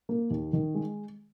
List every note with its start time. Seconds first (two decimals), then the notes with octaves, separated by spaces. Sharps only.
0.09 A#3
0.30 D#2
0.53 D#3
0.75 G#3